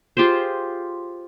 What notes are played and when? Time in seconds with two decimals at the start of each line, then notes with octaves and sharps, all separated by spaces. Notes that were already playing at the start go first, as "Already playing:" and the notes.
0.17 F4 G4 G#4 C5